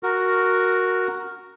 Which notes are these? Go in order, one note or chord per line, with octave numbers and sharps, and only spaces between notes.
F#4 A#4